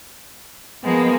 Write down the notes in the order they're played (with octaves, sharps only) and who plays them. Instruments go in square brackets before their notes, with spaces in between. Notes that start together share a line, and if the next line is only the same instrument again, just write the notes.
[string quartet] F3 G#3 A#3 [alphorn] B3